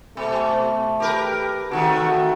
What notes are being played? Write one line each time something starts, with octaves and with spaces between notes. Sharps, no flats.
B2 A3
G4 A#4 B4
C3 D#3 A3 F#4